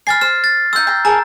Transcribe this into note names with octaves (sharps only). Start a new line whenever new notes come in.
G#5 B5 F6 A6 C7
C5 F6
A6
D#4 F#5 C6 E6 G6
G5 A#5
G#4 A#4 A5 A#5